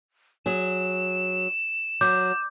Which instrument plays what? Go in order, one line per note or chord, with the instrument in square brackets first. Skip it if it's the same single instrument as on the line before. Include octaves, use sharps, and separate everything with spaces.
[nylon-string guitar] F#3 G#4 [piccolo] E7
[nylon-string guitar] F#3 [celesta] D6 G6